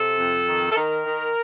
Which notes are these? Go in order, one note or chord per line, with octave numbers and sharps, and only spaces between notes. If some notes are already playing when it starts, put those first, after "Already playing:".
Already playing: C3 A4
F2
D#3
A4
D#3 A#4
D#3